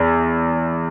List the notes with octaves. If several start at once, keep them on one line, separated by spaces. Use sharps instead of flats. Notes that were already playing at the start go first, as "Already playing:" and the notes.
Already playing: E2